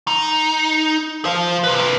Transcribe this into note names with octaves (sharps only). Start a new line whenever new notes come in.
D#4
C5 F5
C3 B4